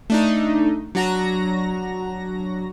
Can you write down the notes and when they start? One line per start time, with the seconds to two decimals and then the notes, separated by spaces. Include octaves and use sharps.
0.10 A3 D4 D#4
0.95 F#3 D4 F#4 A#5 A#6